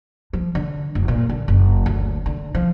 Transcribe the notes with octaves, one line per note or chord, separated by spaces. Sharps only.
F3
D3
F1
A#2
D3
F#1
D2
D3
F3